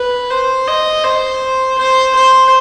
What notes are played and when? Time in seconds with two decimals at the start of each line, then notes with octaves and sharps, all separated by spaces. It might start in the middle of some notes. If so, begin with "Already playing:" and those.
Already playing: B4
0.30 C5
0.67 D#5
1.04 C5
1.78 C5
2.15 C5